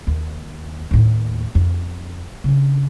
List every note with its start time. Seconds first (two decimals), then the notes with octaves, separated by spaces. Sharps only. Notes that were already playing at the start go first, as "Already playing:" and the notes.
0.07 D#2
0.91 D#2 A2
1.55 F2
2.44 C#3 D4